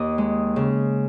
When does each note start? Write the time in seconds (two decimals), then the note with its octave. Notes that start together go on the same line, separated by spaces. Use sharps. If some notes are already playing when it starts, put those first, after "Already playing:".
Already playing: D#2 D#5
0.18 G#3
0.56 C#3